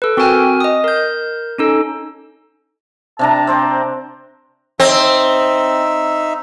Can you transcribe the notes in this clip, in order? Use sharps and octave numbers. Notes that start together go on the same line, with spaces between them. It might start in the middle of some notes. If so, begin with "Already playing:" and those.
A4 B4
C4 F#4 A#4 G5 G#5 F6
D#5 D#6
A#4 G6
C#4 D#4 A4
C3 D4 A5 A#5
C4 C5 D6
C4 D#4 E5